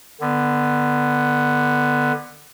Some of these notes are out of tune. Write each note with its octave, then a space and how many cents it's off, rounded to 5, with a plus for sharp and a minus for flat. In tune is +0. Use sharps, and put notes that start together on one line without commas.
D3 +15 B3 +0